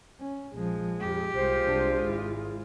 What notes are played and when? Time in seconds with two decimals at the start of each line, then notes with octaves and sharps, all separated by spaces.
0.20 C#4
0.54 A#1 F3 G#3
1.00 F2 G4
1.36 C2 G#3 F4 C5
1.66 C2 D4
2.04 G#1 E4